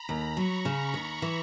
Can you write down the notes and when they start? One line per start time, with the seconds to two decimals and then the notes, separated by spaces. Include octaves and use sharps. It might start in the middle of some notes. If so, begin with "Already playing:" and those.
Already playing: A#5 B5
0.09 D#2
0.37 F#3 C#6
0.65 C#3
0.80 C#6
0.94 D#2
1.22 E3